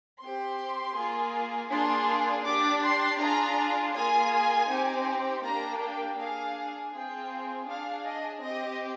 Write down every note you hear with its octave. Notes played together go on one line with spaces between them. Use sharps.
C4 G4 C6
A#3 F4 G#4
A#3 D4 F4 G#4 C6
D4 G4 D6
C6
D4 F4 G#4 A#5
A#3 F4 G#4 G#5
C4 D#4 G4
A#3 D4 G4 A#5
G5
D4 G#4 F5
C4 F4 G#4 G5
D4 G#4 F5
D#5
C4 G4 D#5